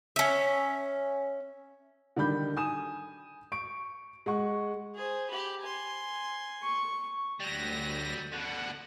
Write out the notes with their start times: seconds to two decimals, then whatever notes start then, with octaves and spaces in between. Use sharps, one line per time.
0.16 C#4 E5
2.16 D3 D#3 G3 B5 G6
2.57 G#5 D#6 E7
3.52 C#6 D7
4.26 G#3 F#5 C#6
4.95 G#4 C5
5.29 G4 B5
5.62 G#5 C6
6.63 C#6
7.40 D2 F#3 G3 A#6
8.32 B2 D3 F#5